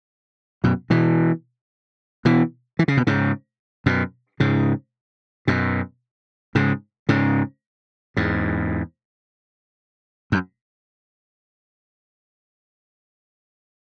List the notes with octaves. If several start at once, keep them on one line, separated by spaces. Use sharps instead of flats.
F#2 B2
B2 E3
B2 E3
E3
C#3
B2
G#2 C#3
F#2 B2
G#2 C#3
F#2 B2
G#2 C#3
G#2 C#3
E2 G#2
F#2